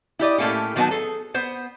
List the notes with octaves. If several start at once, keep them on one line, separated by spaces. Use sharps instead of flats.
E4 G4 D5 D#5
A2 A3 A#3 C#4 G4
D#3 F#3 B3 D#4 A5
G#4 A4
B3 C5